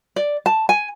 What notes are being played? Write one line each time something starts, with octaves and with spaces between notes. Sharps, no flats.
D5
A5
G#5